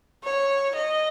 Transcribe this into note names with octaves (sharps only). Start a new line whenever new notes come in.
C#5
D#5